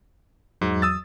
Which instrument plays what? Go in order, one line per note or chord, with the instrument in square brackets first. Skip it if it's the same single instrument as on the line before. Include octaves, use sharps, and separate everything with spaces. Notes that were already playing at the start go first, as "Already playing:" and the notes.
[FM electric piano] E2 F#3 [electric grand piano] G#2
[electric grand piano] D#6 E6 A6